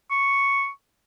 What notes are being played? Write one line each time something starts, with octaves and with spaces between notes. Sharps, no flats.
C#6